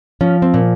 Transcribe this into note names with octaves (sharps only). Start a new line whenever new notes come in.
F3 C#4
C4
A#2